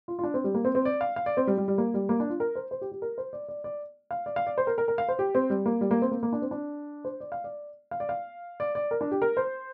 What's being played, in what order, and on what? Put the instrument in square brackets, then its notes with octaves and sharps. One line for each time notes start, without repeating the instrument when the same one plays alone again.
[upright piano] F4
F4
D4
C4
G3
A#3
C4
C4
D5
F5
F5
D5
C4
G3
G3
G3
A#3
G3
A#3
D4
F4
A#4
C5
C5
G4
G4
A#4
C5
D5
D5
D5
F5
D5
F5
D5
C5
A#4
A#4
A#4
F5
C5
G4
C4
G3
A#3
G3
A#3
C4
A#3
A#3
D4
C4
D4
C5
D5
F5
D5
F5
D5
F5
D5
D5
A#4
D4
G4
A#4
C5